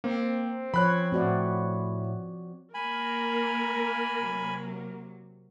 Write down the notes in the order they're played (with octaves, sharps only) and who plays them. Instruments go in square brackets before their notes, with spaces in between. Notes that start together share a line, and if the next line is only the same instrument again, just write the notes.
[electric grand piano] A#3 [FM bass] C4
[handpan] F3 C#5 [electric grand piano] B5 F#6
[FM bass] A2 [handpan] C4 F#4 D5
[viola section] A#3 A#4 [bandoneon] G#5 B5
[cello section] C3 F#3